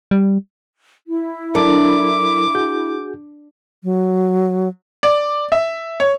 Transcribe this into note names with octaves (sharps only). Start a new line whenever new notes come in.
G3
E4
F#3 D4 A4 A#4 D6
F#4 G#4 G6
F#3
D5
E5
C#5